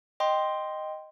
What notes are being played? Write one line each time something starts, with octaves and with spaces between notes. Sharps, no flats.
D#5 G5 C6